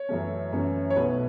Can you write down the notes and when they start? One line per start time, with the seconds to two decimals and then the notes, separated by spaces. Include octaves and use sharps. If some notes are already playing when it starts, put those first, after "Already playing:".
Already playing: C#5
0.09 F#2 E3 A3 C#4
0.52 F#2 E3 A3 C#4
0.90 C#5
0.96 B1 B2 A3 B4